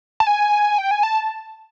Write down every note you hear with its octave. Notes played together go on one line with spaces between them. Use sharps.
A5
G#5
G5
G#5
A5